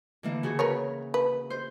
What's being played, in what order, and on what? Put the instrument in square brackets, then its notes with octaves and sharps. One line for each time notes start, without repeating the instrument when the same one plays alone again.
[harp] D3 E3 A#3
C#3 F#4 G#4
[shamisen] A#4 B4 C#5
B4
[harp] C5